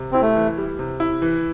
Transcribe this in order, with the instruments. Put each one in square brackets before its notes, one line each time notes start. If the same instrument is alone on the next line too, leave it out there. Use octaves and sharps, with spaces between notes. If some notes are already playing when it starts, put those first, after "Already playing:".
Already playing: [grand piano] C3
[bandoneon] C4 [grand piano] E4
[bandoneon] A3
[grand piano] E3
G3
C3
E4
E3